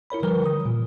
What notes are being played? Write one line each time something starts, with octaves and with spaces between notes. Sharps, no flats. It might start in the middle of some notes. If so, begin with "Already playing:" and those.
E4 A#4 C#5 B5
D3 E3 F3 G3 A#4 B4
D#6
A#2